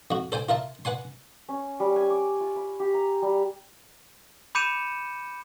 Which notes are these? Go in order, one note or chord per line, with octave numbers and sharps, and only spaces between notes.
F2 F#4
A4 C5 G5 G#5
F4 A#4 E5 A5
B4 F#5 G#5 C6
C#4
G3
G#5
D6
F4
B5
G4
A#5
G3
B5 D6 G6 C#7 D#7 E7